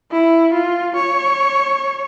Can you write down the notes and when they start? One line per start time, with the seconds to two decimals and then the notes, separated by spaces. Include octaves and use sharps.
0.12 E4
0.53 F4
0.95 C#5